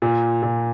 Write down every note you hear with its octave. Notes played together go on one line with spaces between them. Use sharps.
A#2
A#2